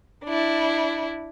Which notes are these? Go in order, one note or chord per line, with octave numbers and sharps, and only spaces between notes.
D4 E4